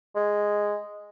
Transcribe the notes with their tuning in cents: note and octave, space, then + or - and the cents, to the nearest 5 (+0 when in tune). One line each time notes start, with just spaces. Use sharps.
G#3 -5